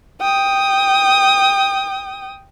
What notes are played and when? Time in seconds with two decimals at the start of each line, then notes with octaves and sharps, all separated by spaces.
0.21 G5 D#6